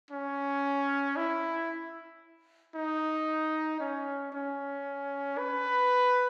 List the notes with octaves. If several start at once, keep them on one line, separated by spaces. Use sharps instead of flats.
C#4
E4
D#4
C#4
C#4
B4